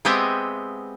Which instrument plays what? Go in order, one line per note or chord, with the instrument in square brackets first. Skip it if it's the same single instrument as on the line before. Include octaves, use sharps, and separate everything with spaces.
[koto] G#3 B3 C4 G4 D#5 E5